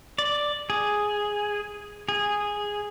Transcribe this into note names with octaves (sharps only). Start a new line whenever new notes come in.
D5
G#4
G#4